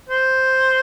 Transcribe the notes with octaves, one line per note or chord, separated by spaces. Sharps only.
C5